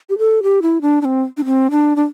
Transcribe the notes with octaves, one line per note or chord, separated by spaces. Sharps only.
G4
A4
G4
E4
D4
D4
C4
D4
C4
D4
D4